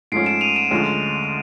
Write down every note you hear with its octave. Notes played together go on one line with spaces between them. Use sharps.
G#2 F3 A3 C#4 C7 D7
D7 E7
D#7 F7
D7 E7
D2 D3 F3 G#3 C#4